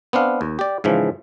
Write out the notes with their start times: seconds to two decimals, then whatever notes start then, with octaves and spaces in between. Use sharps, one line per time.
0.13 B3 C4 D4 F5
0.41 D#2
0.59 G4 D5
0.84 G#2 C#3 E3 F3